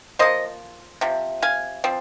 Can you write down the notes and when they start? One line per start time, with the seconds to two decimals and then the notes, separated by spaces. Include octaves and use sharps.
0.19 F3 A#3 C5 D#5
1.01 C3 F3
1.42 F5 G#5
1.84 F3 C4